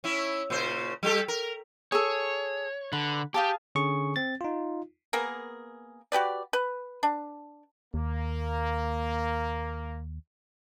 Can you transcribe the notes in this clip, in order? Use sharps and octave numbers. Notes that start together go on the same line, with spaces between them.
C#4 E4
A#2 C#3 C5
G3 G4 A4
A#4
G#4 A4 C#5
D3 B4
G4 G#4 F5 A5
D3 C#4 G#4 C#6
C4 A6
D#4 F4
A#3 B3 G#4 A#4
F#4 G4 B4 D5
B4
D4
D#2 A#3